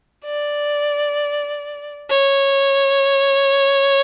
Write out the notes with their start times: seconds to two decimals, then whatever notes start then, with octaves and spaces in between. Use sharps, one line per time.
0.25 D5
2.10 C#5